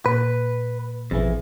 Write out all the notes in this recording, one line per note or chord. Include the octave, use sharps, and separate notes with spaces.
A#2 B4
A1 F2 B2 E3 G#4